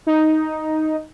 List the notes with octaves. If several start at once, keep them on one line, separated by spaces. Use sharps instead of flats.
D#4